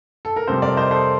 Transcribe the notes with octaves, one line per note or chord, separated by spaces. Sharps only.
A4
A#4
F2 C3 G3 A4 C5
A#4 D5
C5 D#5
A4 C5